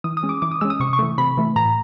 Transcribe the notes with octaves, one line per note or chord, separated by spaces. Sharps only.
E3 D#6
D#6
G#3 C#4
D6
E3 D6
D#6
G#3 C#4 E6
D#6
C3 C#6
C#6
E3 A3
C3 B5
E3 A3
A2 A#5